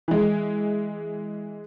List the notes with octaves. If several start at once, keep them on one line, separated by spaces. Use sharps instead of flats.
E3 G#3